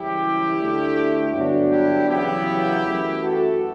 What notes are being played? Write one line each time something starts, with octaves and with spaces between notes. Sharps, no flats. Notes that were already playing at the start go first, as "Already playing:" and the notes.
Already playing: F#1 F#2 E3 G3 E4 G4
D2 D3 A3
G2 D3 F#3 B3 D4 F#4
E4 G4
E2 C#3 F#3 B3 E4 G4
F#2 E3 A3
F#4 A4